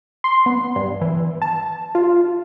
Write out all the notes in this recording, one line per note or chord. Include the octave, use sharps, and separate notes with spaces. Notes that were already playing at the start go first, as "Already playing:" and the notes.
C6
B3
G2
E3
A5
F4